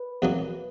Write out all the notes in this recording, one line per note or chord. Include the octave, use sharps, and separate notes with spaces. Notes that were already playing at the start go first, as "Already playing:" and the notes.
Already playing: B4
E2 B2 F#3 A#3 D#4